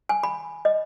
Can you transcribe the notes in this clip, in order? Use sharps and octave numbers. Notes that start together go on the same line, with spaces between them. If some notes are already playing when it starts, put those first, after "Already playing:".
G#5
B5
D#5